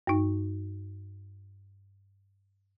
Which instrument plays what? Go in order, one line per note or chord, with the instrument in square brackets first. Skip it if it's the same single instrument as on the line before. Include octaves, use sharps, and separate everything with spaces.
[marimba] G2 D#4